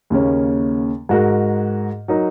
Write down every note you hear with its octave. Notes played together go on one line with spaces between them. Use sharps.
D#2 C#3 A#3 C#4
G#2 G#3 F#4 A#4
F#3 D#4 A#4